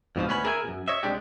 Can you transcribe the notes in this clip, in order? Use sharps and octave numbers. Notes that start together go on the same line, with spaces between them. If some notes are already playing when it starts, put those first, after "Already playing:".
F2 G#2 B2 F3
D2 B3 C#4 B5
G#4 A#4 E5 G5 G#5
F#2 B2
C#5 D#5 E5
C2 G#3 D4 G4